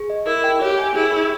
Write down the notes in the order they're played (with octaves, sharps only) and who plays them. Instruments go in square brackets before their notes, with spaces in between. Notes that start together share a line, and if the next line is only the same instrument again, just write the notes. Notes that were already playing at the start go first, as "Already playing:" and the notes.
Already playing: [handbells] G#4
D#5
[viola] E4 [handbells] A#4
[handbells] G5
[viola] G4 [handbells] C#5
[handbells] G#5
[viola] E4 [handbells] G#4
[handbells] G#4